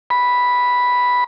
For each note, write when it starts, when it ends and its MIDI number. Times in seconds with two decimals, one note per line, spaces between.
0.10 1.24 83